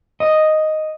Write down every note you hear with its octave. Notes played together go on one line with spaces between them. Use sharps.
D#5